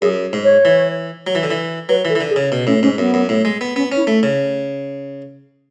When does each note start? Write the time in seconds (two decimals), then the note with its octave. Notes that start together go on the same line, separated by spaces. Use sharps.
0.02 F#2 G#4
0.33 G#2
0.44 C#5
0.65 E3
1.27 F#3
1.35 E3
1.43 D3
1.50 E3
1.89 F#3 B4
2.05 E3
2.10 A4
2.15 E3
2.21 D3
2.30 G#4
2.36 C#3
2.52 B2
2.67 A2 C#4
2.82 G#2 C#4
2.98 F#2 B3
3.14 F#2
3.29 A2
3.45 G#3
3.61 B3
3.76 B3 C#4
3.92 C#4 E4
4.07 A3
4.23 C#3